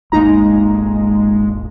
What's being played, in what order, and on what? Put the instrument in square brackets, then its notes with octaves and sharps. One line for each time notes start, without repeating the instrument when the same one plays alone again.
[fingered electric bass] D#1 G#1 A#3 [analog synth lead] G#3 [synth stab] D#4 A#5